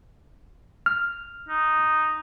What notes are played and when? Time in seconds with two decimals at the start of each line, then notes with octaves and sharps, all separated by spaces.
0.86 F6
1.49 D#4